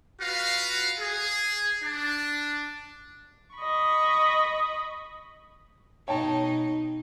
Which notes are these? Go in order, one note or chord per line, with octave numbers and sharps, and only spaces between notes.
F4 F#4 B4 F5
G#4
D4
D#5 B5 C#6
B2 D#4 C#5 G5 A5